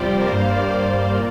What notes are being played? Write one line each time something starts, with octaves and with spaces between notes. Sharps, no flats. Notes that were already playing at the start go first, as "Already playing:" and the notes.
Already playing: F2 C3 G3 F4 G4 C5 D5
A#4
G2 G3 A#3 C5
F5
D5
F5
D5
A#2 A#3